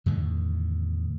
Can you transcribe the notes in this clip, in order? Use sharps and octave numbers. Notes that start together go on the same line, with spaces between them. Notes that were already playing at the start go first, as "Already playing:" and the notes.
E2 A2 D3 D#3